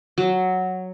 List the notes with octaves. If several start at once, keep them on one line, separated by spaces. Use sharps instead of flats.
F#3